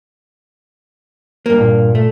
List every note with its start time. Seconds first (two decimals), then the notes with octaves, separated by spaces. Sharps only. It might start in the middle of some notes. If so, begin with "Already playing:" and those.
1.46 G2 A#3
1.60 A#2
1.95 A3